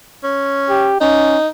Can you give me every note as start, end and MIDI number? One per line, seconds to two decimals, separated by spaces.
0.23 0.95 61
0.69 0.99 67
1.01 1.37 61
1.01 1.48 63